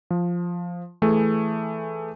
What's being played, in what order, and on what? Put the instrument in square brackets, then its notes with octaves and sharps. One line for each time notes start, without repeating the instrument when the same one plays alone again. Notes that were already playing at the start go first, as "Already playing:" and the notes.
[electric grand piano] F3
E3 A3 G#4